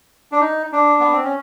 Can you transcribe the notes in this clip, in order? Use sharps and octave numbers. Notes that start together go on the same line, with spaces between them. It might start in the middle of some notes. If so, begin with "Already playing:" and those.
D4
D#4
D4
B3
C4
C#4